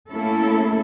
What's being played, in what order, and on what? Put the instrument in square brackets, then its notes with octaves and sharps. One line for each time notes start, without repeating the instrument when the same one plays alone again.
[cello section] A3 A#3 C#4 E4 A4